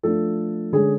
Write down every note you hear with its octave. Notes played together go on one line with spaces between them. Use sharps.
F3 A3 D4 A4
D3 G#3 C#4 G#4